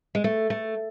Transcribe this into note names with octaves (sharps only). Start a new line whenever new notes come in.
G#3
A3
A3